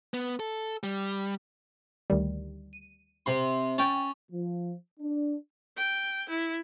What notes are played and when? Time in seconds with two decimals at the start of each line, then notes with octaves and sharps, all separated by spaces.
0.14 B3
0.40 A4
0.83 G3
2.10 D2 D#3 G3
2.73 D#7
3.26 C3 C6
3.78 C#4 G5 A6
4.31 F3
4.99 D4
5.77 G5
6.29 E4